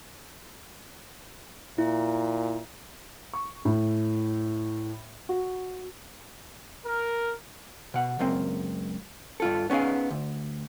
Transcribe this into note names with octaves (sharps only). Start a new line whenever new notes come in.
A#2 E4
C#6
A2
F#4
A#4
B2 F#5
C#2 F#2 A#3 C4
G2 F4 A4
B3 C#4 D#4 G#4 F5
D2